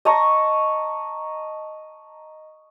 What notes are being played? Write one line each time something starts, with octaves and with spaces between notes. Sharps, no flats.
D#5 A5 A#5 C#6